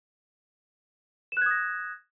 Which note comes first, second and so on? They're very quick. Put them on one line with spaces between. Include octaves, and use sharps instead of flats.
E7 F#6 G#6 D#6 A#6